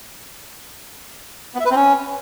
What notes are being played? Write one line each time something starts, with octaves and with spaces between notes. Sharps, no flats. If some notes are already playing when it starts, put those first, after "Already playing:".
B3
E5
B4
C4
C#4